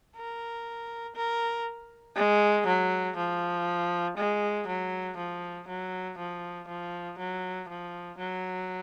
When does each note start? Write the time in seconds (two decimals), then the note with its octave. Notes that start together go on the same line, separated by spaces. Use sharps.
0.16 A#4
1.16 A#4
2.16 G#3
2.67 F#3
3.17 F3
4.18 G#3
4.67 F#3
5.17 F3
5.68 F#3
6.18 F3
6.68 F3
7.19 F#3
7.69 F3
8.18 F#3